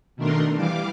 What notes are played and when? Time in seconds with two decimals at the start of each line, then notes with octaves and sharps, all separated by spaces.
0.16 B2 D#3 A3 D4 A#4 C6
0.55 E3 G3 F5 D6